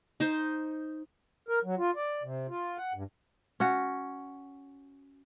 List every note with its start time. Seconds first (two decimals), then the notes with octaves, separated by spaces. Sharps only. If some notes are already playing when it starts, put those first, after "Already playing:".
0.20 D#4 C5
1.49 A#4
1.65 F#3
1.78 F4
1.96 D5
2.23 C3
2.49 F4
2.78 F#5
2.94 G2
3.60 C#4 F#4